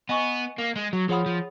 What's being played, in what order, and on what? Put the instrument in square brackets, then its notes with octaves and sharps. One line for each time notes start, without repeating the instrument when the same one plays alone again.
[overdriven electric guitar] B3 [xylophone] D#5 G#5 C#6
[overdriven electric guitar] A#3
G#3
F#3
[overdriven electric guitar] F3 [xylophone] G#4 C#5 F#5 B5 D#6
[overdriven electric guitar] F3